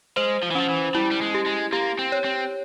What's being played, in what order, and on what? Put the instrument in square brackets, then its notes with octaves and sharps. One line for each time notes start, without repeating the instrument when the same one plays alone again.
[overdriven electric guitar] G#3 [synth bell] C5
[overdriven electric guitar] F3
E3
[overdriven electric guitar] F3 [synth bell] C#4
[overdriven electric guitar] E3
[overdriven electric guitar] G3 [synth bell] E4
[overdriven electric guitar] G3
G#3
[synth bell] G4
[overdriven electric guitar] G#3
[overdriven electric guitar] A#3 [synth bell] G4
[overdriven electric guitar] C4
[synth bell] C#5
[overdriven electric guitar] C4